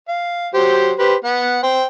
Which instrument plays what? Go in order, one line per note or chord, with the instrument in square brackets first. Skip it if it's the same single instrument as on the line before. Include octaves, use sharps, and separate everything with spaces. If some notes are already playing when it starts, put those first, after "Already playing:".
[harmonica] F5
F#3 G4 C5
G4 B4 C5
B3 F#5
C5 G5